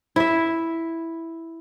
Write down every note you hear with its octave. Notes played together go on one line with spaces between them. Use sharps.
E4 E5